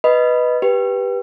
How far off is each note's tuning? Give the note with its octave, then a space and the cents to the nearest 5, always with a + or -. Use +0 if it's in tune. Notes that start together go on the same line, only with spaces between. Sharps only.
B4 +0 D#5 +0 B5 +0
G4 +0 B4 -10